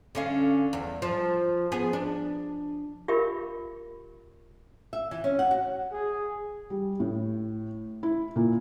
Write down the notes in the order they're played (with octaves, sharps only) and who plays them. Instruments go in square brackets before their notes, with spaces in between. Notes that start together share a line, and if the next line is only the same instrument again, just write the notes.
[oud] D3 C#4 F5
E2
F3
B3 G#4
D4
[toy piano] F4 G4 A#4 E5 B5
[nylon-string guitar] E5
E3
C#4
F#5
F#4
[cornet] G#4
[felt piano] G3
A2
E4
A#2